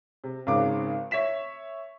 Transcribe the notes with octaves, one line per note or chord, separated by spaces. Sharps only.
C3
G#1 G#2 C#3 C4 D6
C#5 E5 B6 E7